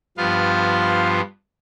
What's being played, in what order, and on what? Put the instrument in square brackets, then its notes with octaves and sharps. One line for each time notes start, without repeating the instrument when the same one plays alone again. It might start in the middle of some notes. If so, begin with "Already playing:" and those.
[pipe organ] G2 F3 B3 F4 F5